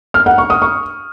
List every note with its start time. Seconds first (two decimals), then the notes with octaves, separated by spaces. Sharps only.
0.14 F6
0.26 F#5
0.38 C#6
0.50 D#6
0.62 C#6